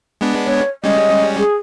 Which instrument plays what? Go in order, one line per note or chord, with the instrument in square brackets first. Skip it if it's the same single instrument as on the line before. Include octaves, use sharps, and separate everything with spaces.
[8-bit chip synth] G#3 B3 D4
[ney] C#5
[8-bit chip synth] G3 G#3 C#4 [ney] D#5
[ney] G#4